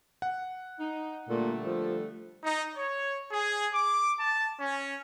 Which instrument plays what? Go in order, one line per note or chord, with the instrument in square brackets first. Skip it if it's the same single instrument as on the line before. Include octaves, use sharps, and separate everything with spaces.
[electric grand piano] F#5
[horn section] D#4
[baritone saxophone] A#2 [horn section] D3 G3 A3
[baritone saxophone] F3
[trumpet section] D#4
C#5
G#4
D6
A5
C#4